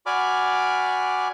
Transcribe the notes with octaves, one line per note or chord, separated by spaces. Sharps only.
F#4 D5 G#5 B5 D6 F6